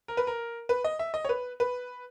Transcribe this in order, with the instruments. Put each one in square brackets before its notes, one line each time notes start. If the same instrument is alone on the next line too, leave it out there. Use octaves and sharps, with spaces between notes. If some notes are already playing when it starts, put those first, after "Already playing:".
[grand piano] A#4
B4
A#4
B4
D#5
E5
D#5
C#5
B4
B4